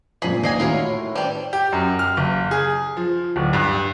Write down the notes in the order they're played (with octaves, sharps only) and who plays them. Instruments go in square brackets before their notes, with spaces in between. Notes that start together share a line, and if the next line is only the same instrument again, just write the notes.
[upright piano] G2 A#2 F3 [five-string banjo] G#4 D#5 B5
[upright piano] D#1 [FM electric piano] D#3 C7 [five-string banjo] A#3 D#5 G#5
[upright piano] A2 F#4 [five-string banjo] F4 A#4 C#5
[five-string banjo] G3 D4 [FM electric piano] B4 C5 G5
[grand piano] G4
F#2
F6
F#1
G#4
F3
D1
G2